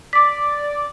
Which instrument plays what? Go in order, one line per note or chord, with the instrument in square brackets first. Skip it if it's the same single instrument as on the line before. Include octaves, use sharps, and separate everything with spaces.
[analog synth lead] D5 [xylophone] D6 B6